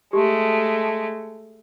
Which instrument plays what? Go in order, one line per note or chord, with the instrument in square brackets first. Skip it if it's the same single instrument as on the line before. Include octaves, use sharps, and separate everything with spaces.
[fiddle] G#3 A3 [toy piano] G4